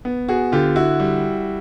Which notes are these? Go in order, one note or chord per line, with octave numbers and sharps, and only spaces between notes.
B3
F#4 G#4
D3 F4 G4
E4 F#4
G3